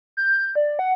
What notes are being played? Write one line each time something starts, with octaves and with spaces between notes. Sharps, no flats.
G6
D5
F#5